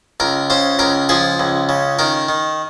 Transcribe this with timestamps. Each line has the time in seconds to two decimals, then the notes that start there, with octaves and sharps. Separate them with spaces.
0.20 C#2 A#4
0.50 C#3 C5
0.79 C#2 A#4
1.09 F3 G#4
1.40 C#2
1.69 C#3
1.99 D#3 A#4
2.29 D#3